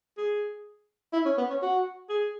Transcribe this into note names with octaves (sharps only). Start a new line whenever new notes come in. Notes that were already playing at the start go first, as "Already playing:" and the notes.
G#4
E4
C#4
B3
C#4
F#4
G#4